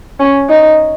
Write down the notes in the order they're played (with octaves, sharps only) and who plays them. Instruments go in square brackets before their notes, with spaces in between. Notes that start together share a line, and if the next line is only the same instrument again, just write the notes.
[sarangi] C#4
D#4